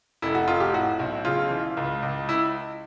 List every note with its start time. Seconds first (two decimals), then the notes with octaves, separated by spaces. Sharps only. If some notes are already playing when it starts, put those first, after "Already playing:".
0.22 F1 E4
0.35 F#4
0.48 F1 F4
0.60 G4
0.73 A2 F#4
0.99 B1
1.25 C#3 F4
1.51 E3
1.77 C#2
2.03 C#2
2.29 E4